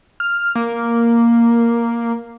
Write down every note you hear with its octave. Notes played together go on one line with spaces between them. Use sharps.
F6
A#3